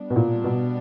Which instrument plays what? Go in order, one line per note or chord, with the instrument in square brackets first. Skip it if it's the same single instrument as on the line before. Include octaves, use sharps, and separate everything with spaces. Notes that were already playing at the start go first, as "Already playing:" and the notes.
Already playing: [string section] G3 B3 D4
[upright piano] B2
A#2
B2